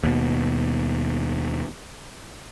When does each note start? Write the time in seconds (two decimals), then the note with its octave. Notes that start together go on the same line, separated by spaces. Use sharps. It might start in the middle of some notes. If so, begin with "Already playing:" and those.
0.04 D#2 B2